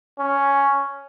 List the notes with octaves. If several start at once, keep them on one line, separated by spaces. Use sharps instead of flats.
C#4